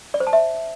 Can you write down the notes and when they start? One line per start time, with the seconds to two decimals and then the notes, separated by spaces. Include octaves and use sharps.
0.14 D5
0.20 C5
0.27 A5
0.33 E5